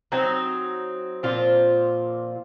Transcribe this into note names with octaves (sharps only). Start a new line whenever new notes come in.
F#3 C4 D#4
A#2 F3 C4 F4